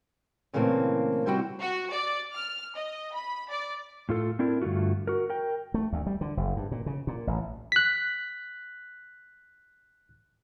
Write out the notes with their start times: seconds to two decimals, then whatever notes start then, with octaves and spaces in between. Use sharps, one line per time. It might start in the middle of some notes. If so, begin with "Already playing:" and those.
0.53 A#2 C#3 E3 A3 A#3 C4
1.26 C3 G3 E4 F#4 G5
1.61 F#4
1.93 D5
2.34 F6
2.75 D#5
3.15 B5
3.50 D5
4.09 A2 F4 A4
4.39 C4 D4 E4 A#4
4.62 G2 D3 A3 F4 F#4
5.07 F#4 A#4
5.30 A#4 G5
5.74 A3
5.93 D2
6.06 G3
6.21 D3
6.37 F#1
6.56 G2
6.71 A#2
6.86 C#3
7.07 A#2
7.27 A1
7.72 F#6 B6